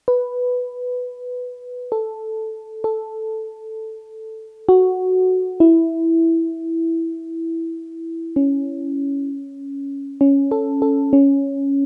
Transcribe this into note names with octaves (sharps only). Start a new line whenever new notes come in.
B4
A4
A4
F#4
E4
C#4
C#4
A4
A4
C#4